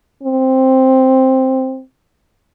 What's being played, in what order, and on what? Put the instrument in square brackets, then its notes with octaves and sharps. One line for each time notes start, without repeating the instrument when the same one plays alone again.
[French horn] C4